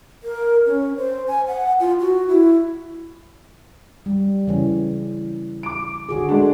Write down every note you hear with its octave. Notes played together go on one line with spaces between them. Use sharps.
A#4
C#4
C5
G#5
F#5
F4
F#4
E4
G3
C#3 E3 C#4
D6 D7
D3 F#4 G#4
G#3 A3 D4